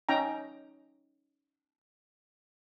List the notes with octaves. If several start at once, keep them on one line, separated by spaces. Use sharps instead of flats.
C#4 D#4 G5 A#5